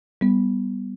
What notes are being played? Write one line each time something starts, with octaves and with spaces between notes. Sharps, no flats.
G3 B3